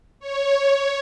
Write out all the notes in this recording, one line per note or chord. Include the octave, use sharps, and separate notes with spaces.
C#5